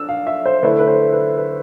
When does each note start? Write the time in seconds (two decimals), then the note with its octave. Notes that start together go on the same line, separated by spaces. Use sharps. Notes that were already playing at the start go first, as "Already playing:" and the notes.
Already playing: D4 E6
0.09 F5
0.27 E5
0.46 C5
0.63 D3 A3 E4 B4
0.79 B4
0.87 C5
1.13 B4
1.37 B4